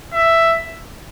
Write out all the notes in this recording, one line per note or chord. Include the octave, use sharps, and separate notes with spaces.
E5